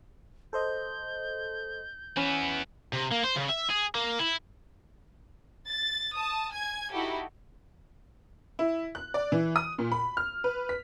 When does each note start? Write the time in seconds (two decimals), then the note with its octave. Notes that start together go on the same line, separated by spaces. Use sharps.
0.53 A4 C5 D#5 G6
2.17 E3 B3 C#4
2.93 C3
3.12 A#3
3.24 C5
3.36 C#3
3.50 E5
3.70 G#4
3.95 A#3
4.19 E4
5.68 A6
6.16 A5 D#6
6.52 G#5 G#6
6.92 D#4 E4 F#4 G4 A4
8.59 E4
8.95 F#6
9.14 D5
9.32 E3
9.56 D#6
9.78 A#2
9.92 B5
10.17 F6
10.44 B4
10.69 B6